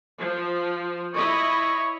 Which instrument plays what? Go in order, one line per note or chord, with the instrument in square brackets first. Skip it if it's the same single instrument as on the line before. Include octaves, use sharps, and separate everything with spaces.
[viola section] F3
[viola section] E4 D#5 B5 [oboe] C#5